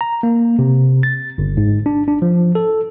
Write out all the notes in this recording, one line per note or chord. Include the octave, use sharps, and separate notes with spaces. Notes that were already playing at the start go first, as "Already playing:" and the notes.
A#5
A#3
C3
A6
G1
G#2
D4
D4
F3
A4